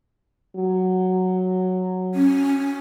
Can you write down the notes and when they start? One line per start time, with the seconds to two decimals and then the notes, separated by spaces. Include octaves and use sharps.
0.56 F#3
2.14 C#4